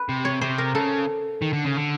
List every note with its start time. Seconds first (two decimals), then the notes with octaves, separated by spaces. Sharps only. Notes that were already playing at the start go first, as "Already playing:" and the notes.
Already playing: B4
0.09 C3
0.25 C#5
0.41 C3 C5
0.58 A#4
0.75 C#3 A4
1.42 D#3
1.53 D3
1.65 C#3
1.77 D3